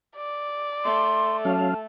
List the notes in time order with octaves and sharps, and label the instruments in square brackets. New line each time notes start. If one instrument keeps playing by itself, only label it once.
[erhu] D5
[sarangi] A3 [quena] C6
[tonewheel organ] F#3 C#4 F5 [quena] A5